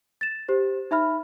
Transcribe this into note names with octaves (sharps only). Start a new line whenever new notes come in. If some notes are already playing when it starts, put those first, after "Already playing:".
A6 E7
G4 C5
D#4 E5 B5 F6